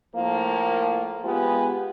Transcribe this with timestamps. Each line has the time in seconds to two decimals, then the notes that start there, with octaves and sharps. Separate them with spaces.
0.15 A2 F3 A#3
1.25 G#3 B3 F4 G4